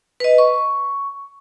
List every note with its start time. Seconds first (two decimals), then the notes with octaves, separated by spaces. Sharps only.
0.20 B4 D#5
0.38 C#6